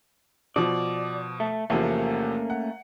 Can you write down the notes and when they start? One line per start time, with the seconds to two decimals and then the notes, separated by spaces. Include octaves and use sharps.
0.56 B2 F3 D5
1.40 A3
1.70 E2 C3 F3 A3 A#3 C#4
2.50 F#5